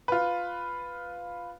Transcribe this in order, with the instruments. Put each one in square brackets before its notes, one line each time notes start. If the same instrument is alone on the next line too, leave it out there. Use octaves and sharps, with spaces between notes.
[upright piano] F4 B4